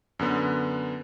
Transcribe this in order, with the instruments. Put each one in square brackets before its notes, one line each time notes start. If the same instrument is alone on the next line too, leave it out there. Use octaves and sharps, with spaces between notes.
[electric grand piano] F#2 D3 B3